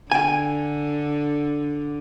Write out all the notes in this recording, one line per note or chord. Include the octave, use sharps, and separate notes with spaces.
D3 G5 G#5